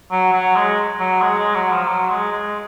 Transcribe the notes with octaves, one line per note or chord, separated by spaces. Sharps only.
F#3
F#3
G#3
F#3
G#3
G#3
F#3
F3
F#3
G#3
G#3